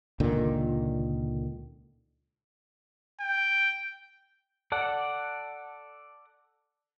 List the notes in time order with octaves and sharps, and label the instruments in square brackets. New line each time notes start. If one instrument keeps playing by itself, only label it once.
[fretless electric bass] C#2 A#2 D3 D#3
[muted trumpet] G5
[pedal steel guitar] A4 D5 F#5